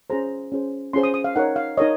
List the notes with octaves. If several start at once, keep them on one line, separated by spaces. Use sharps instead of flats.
C#4 F4 G#4 C5 A#5
C#4 F4 G#4 C5
C#4 F4 G#4 C5 C6
D#6
D#6
F5
D#4 A#4 C#5 F#5
F5
D#4 A#4 C#5 D#5